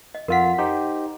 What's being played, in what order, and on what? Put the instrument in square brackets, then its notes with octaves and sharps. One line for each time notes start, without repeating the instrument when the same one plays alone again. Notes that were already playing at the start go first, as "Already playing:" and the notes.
[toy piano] D#5
[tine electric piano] F2 F4 B6 [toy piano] A#4 F#5
[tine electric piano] D#4 G4 C5